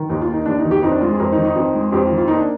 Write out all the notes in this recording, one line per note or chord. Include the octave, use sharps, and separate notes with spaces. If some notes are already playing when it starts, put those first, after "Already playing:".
Already playing: D#3
D#2 D#4
F4
A#3
D#4
D#2 D4
D#4
D#3
G4
F2 D#4
D4
G#3 F4
G#4
F2 A#4
D#4
D#3
D#4
F2
G#3
F2 G4
F4
D#3
F4
A#3 D#4
D4